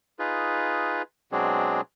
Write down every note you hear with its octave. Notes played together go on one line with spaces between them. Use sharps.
D#4 F4 G#4 B4
B2 F#3 G#3 C4 D4 G#4